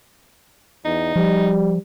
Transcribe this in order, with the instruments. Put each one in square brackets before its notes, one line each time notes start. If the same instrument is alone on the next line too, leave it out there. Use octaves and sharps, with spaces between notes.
[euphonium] E2 [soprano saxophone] D#4
[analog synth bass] F3 [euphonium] G3